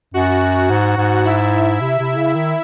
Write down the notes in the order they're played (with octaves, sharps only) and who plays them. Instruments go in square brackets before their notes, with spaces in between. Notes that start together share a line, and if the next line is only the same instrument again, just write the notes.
[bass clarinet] F#2 [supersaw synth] F#4 F#5
[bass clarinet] G#2
G#2
[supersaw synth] E4 E5
[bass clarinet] C3
C3
C#3
D#3